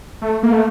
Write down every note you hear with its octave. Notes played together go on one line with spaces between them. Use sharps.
A3
A#3
A3